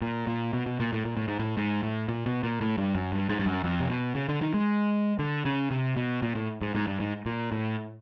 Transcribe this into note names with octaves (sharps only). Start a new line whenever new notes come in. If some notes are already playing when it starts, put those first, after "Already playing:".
A#2
A#2
B2
B2
A#2
A2
A#2
A2
G#2
A2
G#2
A2
A#2
B2
A#2
A2
G2
F#2
G2
G#2
G2
F#2
F2
C3
B2
C#3
D3
D#3
G#3
D3
C#3
C3
B2
A#2
A2
G#2
G#2
G2
G#2
A#2
A2